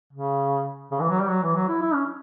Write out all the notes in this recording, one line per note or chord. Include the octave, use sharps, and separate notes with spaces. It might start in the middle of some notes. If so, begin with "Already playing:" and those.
C#3
C#3
E3
F#3
G3
F#3
E3
F#3
E4
E4
C#4